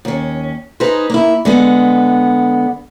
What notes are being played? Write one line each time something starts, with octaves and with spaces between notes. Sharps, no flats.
D#2 C#4
D#4 G#4 B4 C5
A#3 E4
D3 G#3 B3